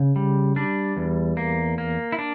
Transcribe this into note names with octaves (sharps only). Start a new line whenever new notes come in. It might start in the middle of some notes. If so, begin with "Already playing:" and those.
Already playing: C#3
G3
G3 D4
E2
A#3
A#3
E4
D4